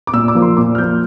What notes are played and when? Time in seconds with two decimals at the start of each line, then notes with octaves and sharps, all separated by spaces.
0.07 D6
0.13 A#2 E6
0.28 D6
0.35 F3 A#3
0.42 C6
0.57 A#2 D6
0.75 F6
0.78 F3 A#3 G6